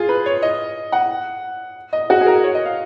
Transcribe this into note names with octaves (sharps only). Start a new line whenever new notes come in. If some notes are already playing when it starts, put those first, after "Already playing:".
Already playing: F4 G#4
B4
C#5
D#5
F#5
D#5
F#4
G#4
A#4
C#5
D#5
F5